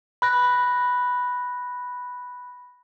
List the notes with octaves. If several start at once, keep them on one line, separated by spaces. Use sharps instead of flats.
B5 F#6 A#6